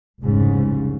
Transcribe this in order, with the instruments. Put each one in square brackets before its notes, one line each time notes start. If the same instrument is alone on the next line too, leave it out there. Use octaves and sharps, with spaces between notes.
[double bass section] F1 C2 G#2 C#3